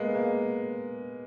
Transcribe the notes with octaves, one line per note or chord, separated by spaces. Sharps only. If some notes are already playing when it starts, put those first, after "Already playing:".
Already playing: G#3 A#3 B3
A#3